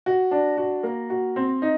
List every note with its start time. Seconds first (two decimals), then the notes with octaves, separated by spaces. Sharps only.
0.06 F#4
0.31 D4
0.58 F#4
0.83 A#3
1.10 F#4
1.36 C4
1.62 D#4